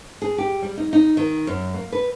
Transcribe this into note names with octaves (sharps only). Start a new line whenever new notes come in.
G#4
G4
G3
D#4
D#4
D#3
F#2
A#3
B4